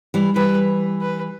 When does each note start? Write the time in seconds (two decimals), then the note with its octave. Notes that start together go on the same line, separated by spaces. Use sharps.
0.14 E3 G3
0.36 E3 G3 B4
1.01 B4